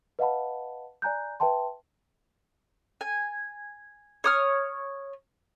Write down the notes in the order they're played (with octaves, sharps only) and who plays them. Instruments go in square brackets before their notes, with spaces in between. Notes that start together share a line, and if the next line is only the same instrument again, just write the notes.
[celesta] B4 D#5 F5 F#5 A5 B5
D5 G#5 A#5 F#6 G6
B4 E5 G5 A5 C6
[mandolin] G#5
C#5 D#6 F6